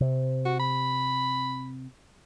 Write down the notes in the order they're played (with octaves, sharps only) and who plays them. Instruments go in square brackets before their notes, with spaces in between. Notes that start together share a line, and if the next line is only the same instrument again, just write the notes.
[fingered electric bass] C3
[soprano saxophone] F#4
B5